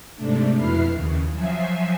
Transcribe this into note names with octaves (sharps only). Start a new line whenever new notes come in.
G#2 C3 A3 D4
F2 B2 E4 B4 F6 C7
D#2 C#3
F3 F#3 E5 G#5 C7